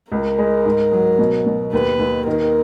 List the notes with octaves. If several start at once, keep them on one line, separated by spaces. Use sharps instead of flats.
C#2 A#4
G#3
G#2
F#3
B2
B2
D#2 B4
D#2
D#3 A#4